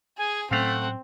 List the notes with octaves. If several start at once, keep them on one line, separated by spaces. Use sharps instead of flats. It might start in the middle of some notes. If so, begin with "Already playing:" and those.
G#4 G#5
A2 F#3 A3 C4 C#4 F5 F#5